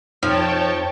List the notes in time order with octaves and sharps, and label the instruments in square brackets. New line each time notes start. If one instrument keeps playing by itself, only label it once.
[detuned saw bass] F2 [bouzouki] F3 [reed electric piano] D#4 [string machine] C#5 G5 A5